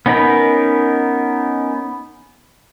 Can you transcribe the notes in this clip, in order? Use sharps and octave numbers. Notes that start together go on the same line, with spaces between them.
B3 C#4 D#4 A#4 B5